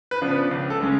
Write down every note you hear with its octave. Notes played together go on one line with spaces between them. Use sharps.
B4
C#3 F3 B3 D4
B4
C#2
A4
C#3 G#3 C#4